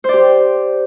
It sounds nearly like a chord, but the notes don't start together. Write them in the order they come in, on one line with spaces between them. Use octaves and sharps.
C5 D5 G4